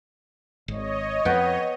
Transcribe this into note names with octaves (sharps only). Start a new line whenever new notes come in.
G#1 C#5 D#5
F2 B3 B4 G5